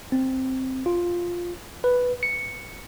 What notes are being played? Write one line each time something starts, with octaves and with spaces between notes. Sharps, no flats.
C4
F4
B4
C#7